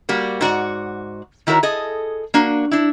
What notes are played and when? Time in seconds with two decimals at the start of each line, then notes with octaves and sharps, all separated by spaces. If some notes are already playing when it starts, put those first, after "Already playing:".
0.09 G3 A#3 F#4
0.41 G#2 F#4 D5 F#5
1.47 D#3 E4 F#4 A#4 C#5
1.63 G#4 A4 D#5
2.34 A#3 D4 F#4
2.71 D4 E4